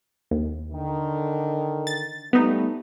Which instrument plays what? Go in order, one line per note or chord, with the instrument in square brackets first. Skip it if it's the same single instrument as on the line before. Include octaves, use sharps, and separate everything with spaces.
[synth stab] D#2
[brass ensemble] D3 D#3
[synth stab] A6
[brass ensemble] G3 A3 [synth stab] B3 D#4